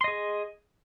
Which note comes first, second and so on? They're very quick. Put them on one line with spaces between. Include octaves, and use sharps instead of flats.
C6 D#5 G#4